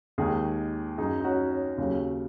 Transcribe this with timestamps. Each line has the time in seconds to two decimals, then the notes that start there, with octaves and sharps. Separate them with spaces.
0.18 D#2 D#3 G#3 D#4 G#4
0.98 F#2 F#3 D#4 G#4
1.20 D#4
1.24 C#4 F#4
1.51 C#4
1.78 D#2 C#3 F#3